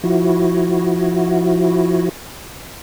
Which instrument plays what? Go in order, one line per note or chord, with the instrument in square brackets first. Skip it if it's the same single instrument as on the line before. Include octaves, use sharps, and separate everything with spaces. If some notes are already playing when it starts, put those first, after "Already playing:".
[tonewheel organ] F3 E4 F#4